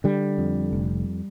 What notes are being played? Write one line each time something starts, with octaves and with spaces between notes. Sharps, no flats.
D3 G3
F2
F1